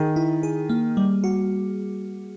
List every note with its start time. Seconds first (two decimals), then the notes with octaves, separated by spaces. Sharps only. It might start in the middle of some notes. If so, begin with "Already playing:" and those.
Already playing: D#3 G#4
0.16 E4
0.43 G#4
0.70 A#3
0.97 G3
1.24 F#4